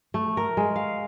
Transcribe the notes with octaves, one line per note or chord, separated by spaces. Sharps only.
A3
A#4
G#3
F5